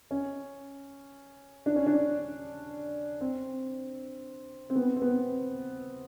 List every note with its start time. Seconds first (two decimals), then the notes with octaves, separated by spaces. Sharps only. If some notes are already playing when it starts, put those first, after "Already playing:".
0.11 C#4
1.66 D4
1.76 C#4
1.86 D4
3.21 C4
4.70 C4
4.75 B3
4.96 C4
5.02 B3